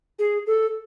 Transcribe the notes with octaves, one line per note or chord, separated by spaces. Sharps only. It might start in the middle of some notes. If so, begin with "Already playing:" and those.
G#4
A4